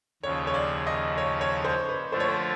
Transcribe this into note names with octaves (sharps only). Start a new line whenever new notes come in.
D#2 C#3 F3 C#5
C#5
D5
D#5
C#5
C#5
C5
B4
D3 F3 A3 D4 F4 C5
C#5
C5